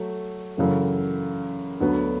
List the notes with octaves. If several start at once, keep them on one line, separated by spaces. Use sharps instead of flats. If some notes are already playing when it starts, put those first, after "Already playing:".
Already playing: F#3 A3
F#2 C#3 E3 A3
D2 D3 F#3 B3